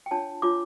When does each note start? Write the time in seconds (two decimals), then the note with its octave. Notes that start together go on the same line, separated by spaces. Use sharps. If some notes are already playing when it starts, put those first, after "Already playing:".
0.06 G5
0.11 D4 F4 C#5 A5
0.42 D4 F4 C#5 D6